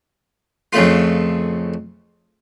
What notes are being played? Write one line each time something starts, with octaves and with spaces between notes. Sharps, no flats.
F2 C#3 A3 F4